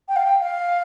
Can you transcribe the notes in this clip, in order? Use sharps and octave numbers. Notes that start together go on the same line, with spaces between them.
G5
F5
G5
F5